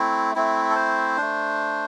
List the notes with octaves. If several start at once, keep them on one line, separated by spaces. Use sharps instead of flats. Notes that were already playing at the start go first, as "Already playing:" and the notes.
Already playing: A3 C4 E4
A3 C4 E4
A4
C5
A3 D4